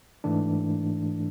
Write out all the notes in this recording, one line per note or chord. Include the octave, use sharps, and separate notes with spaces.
G#2 E3 A3 D4